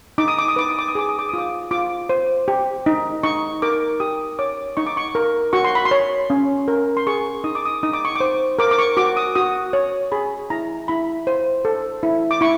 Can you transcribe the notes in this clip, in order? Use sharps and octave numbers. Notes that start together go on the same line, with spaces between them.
D#4 D6
D#6
D6
D#6
B4 D6
D#6
D6
D#6
G#4 D6
D#6
D6
F4 D#6
D6
F4 D6
C5
G4
D#4
D#4 C#6
A#4 D6
G4 D#6
C#5 D6
D#4 C#6
D6
C#6
A#4
F#4 C#6
C6
B5
C6
C#5
C#4
A#4
C6
G#4 C#6
D#4 D#6
D6
D#6
D#4 D#6
D6
C#6
C5 D6
A#4 D6
D6
C#6
F#4 D6
D#6
F#4 D#6
C#5
G#4 B5
E4 A#5
E4 B5
C5
A4
E4
D6
E4 C#6